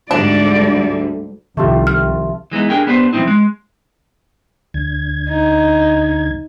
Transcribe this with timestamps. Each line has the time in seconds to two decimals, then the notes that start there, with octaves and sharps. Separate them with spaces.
0.11 D2 G#2 D3 G3 D4 D5
1.57 C2 D#3 F3 A3 F4 G4 E5
1.87 F6
2.51 E3 G#3 B3 D#4
2.70 D4 G4 G#4 A#4 G5
2.87 B3 D4 G4 B4 C5
3.13 E3 F3 G3 C4 D#4 E4
3.28 G#3
4.74 D2 D3 G#6
5.29 D#4